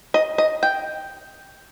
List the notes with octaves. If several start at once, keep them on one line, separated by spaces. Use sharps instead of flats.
D#5
D#5
G5